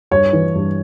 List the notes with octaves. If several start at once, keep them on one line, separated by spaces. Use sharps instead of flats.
G2 C#5
E3
G2